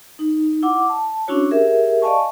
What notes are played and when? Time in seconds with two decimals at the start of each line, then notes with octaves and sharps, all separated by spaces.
0.19 D#4
0.63 E4 F#5 D6
0.89 A5
1.28 C#4 D4 E4 F#4 C#5
1.51 G4 G#4 A#4 E5
2.02 D5 D#5 F5 G#5 A5 C#6